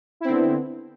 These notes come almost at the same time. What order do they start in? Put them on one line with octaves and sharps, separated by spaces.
E4 C4 D3 B3